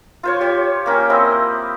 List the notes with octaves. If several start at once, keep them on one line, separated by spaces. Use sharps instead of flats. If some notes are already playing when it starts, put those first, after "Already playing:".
F4 C5 C#5
G4 C#5
A#3 C#4 G4
C4 E4 C5 D#5